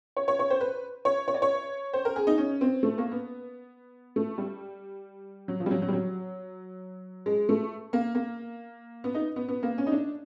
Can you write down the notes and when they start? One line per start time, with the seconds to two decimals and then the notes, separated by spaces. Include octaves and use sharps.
0.17 C#5
0.28 C#5
0.39 C#5
0.50 C5
0.61 B4
1.05 C#5
1.28 C#5
1.34 D5
1.42 C#5
1.93 C5
2.05 A#4
2.16 G#4
2.27 D#4
2.38 C#4
2.61 C4
2.83 A3
2.98 A#3
3.12 B3
4.16 A3
4.38 G3
5.48 F#3
5.60 F3
5.66 G3
5.71 F#3
5.82 F#3
5.88 G3
5.93 F#3
7.26 G#3
7.49 A3
7.93 A#3
8.15 A#3
9.04 B3
9.14 D#4
9.36 B3
9.49 B3
9.63 A#3
9.78 C#4
9.86 D#4
9.92 D4